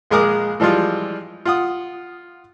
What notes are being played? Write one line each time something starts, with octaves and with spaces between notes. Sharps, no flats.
A#1 G#3 G#4 A#4 D6 D#6
E3 F3 G3 G#3 F4
F4 F#5 D#6